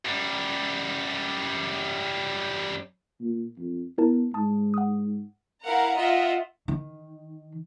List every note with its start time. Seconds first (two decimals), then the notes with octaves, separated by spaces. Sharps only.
0.05 F#2 G3
3.21 A#2
3.58 F2
3.98 B3 E4 A#4 A5
4.34 G#2 A5 D#6
4.74 F#5 D#6
5.65 E4 A#4 F5 F#5 A#5
5.96 F4 D#5 E5 F#5
6.68 D#3